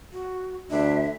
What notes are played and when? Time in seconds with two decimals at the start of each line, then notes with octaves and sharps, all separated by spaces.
0.13 F#4
0.71 D2 D4 E5